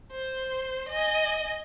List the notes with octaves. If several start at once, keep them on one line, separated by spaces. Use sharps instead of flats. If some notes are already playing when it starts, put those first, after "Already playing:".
C5
D#5 G#5